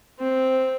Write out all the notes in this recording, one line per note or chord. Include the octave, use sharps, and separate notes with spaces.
C4